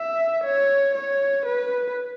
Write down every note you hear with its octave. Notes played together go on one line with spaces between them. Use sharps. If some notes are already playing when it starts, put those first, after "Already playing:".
Already playing: E5
C#5
C#5
B4